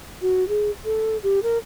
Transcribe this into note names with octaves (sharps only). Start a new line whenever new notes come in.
F#4
G#4
A4
G4
A#4